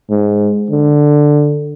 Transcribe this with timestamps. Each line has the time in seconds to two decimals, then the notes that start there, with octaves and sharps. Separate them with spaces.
0.10 G#2
0.71 D3